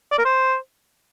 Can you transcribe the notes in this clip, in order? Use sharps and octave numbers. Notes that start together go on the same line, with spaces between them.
D5
A#4
C5